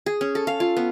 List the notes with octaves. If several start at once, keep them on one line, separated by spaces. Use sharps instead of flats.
G#4
C#4
A4
F5
F4
B3